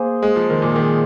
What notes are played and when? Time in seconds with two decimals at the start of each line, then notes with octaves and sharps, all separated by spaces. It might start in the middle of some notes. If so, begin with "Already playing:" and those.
Already playing: A#3 G#4 C5
0.23 G#3
0.36 F3
0.50 D#3
0.62 A#2
0.76 D#3